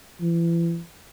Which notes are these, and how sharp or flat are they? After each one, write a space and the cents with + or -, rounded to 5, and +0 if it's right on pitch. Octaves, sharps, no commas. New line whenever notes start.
E3 +35